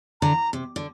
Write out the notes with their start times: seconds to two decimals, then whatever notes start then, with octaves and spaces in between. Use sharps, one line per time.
0.21 D3 A#5
0.53 C3
0.76 D3